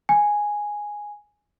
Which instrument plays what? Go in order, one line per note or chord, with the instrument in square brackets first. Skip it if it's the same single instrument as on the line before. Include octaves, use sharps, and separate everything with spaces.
[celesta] G#5